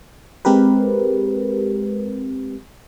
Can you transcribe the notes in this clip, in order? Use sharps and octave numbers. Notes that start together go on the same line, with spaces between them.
G#3 C4 G4 A#4 B4